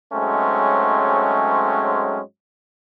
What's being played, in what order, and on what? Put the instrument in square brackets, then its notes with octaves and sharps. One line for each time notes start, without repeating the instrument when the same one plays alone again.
[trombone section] G#2 F#3 G#3 A3 C4 C#4